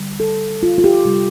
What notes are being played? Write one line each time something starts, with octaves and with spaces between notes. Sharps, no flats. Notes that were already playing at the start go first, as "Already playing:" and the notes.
Already playing: D3 G3
A4
F4
F4
G4
C3 G3